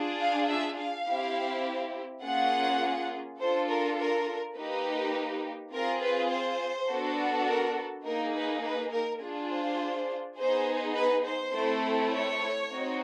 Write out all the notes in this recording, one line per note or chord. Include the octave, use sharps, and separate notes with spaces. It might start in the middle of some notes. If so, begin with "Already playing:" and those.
Already playing: D4 F4 G#4
F5
E5
F5
C4 E4 G4
A#3 C#4 F4 G#4 F#5
D4 F4 A4 C5
A#4
A#4
A#3 D#4 G4 B4
C4 F4 G#4 A#4
B4
C5
B3 D4 F#4 A4
A#4
A#3 D#4 G#4 A#4
B4
B4
A#4
D4 F4 G#4
C5
B3 D#4 G#4 C5
B4
C5
A3 C4 E4 A4
C#5
C4 D#4 F#4